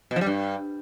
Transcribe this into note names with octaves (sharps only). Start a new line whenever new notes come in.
B2
F3
G3
G2